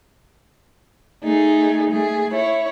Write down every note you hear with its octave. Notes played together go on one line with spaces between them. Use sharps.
A3 D#4 G#4
A3 G#4
E4 C#5